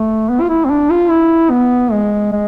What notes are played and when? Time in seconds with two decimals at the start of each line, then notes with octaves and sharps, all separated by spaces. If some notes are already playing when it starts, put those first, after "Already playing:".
Already playing: A3
0.29 B3
0.41 F4
0.49 E4
0.65 C4
0.70 D4
0.90 F4
1.10 E4
1.51 B3
1.92 G#3
2.32 G#3